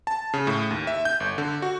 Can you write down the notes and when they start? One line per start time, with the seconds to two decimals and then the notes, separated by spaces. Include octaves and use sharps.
0.07 A5
0.34 C#3
0.47 A2
0.71 D#2
0.87 E5
1.05 G6
1.20 G1
1.38 D3
1.62 F#4